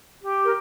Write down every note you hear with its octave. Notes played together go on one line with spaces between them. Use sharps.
G4
A#4